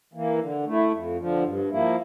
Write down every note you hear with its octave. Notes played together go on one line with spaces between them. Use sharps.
E3 A#3
D3
A3 E4
F2
D3 F3
G2
F3 A#3 E4